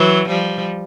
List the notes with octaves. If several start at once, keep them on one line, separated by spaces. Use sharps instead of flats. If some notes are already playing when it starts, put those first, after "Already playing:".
Already playing: E3 F#3
F3 G3